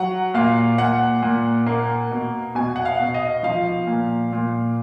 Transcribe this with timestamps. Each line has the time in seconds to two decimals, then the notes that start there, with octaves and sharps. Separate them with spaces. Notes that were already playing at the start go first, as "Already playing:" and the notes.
Already playing: F#3 F#5
0.34 A#2 F5
0.78 A#2 F#5
1.22 A#2
1.66 A#3
2.11 B2
2.55 B2 G#5
2.76 F#5
2.85 F5
3.00 B2
3.14 D#5
3.43 F3 F5
3.87 A#2
4.33 A#2